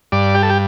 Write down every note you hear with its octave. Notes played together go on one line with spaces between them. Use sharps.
G2 D5
G4
A4
G4